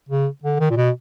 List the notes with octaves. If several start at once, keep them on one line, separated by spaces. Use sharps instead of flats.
C#3
D3
D#3
A#2
B2